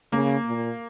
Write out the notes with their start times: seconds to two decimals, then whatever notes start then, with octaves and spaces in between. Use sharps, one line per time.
0.12 C#3 A#3
0.46 A#2